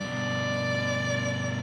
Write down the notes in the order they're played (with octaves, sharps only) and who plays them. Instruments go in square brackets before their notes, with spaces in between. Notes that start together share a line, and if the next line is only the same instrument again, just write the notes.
[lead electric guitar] G2 B2 [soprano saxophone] D5